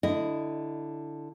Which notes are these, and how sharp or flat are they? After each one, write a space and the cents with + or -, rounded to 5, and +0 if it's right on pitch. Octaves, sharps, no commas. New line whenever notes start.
D3 +0 E4 +0 D#5 -10